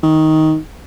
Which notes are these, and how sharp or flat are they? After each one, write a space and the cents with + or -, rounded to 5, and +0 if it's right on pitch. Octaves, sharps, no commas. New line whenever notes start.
D#3 +10